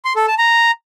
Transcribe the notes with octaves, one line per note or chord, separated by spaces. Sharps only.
C6
A4
A5
A#5